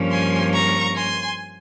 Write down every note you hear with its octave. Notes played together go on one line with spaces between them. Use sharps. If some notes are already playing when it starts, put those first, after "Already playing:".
Already playing: G2 F3 A#3 C#4
G#5 C6
A#5 C#6
G#5 C6